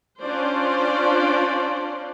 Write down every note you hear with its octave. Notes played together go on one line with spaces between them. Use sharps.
C#4 D4 F4 C5 D5